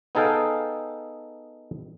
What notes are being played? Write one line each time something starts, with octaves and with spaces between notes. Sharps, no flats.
B3 D#4 G#4 A4 F5 G5